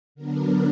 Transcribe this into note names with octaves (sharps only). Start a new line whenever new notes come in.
D3 F#3 B3 D4 A#4